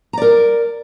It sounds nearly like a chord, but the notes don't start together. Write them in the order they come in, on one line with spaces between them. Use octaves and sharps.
A#5 D5 A#4